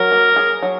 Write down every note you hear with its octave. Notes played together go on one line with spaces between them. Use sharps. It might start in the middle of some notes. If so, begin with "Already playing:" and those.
Already playing: F#3 A#4
A#3
G#4
F#3